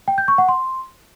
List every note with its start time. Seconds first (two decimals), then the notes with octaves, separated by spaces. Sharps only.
0.08 G5
0.18 G6
0.28 C#6
0.38 F#5
0.49 C6